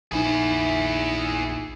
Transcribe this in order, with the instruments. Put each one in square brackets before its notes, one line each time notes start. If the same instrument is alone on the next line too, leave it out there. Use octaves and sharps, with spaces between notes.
[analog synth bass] A#1 [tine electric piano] D#4 G#5 [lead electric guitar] E4 G#4